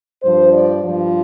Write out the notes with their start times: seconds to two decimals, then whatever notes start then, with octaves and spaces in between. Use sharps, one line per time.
0.23 G2 F3 C5
0.53 D5
0.84 G2 F3